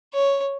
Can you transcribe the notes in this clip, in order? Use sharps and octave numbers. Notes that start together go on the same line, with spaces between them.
C#5